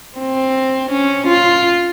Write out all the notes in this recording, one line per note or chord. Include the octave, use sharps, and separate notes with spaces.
C4
C#4
F4